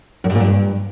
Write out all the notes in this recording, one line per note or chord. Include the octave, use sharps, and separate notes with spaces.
F#2
G2
A#2
G2